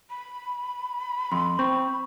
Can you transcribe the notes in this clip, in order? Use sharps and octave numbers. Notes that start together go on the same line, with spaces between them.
B5
F2 C6
C4 C#6